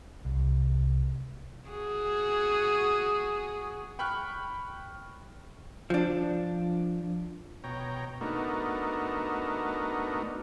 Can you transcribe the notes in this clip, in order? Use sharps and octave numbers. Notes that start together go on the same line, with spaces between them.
C2
F#4 G#4
G5 B5 C#6 F6 F#6
F3 D4
B2 C#5 G5 A#5
A3 B3 D4 D#4 F#4 A#4